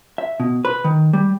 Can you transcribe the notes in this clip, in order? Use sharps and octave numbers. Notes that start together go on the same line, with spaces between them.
E5
B2
B4
D#3
G3